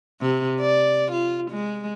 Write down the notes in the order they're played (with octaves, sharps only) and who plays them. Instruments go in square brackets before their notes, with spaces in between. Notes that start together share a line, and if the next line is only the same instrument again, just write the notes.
[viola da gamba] C3
D5
F4
G#3